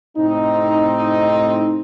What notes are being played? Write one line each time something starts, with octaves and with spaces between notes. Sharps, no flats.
A2 C3 C4 D#4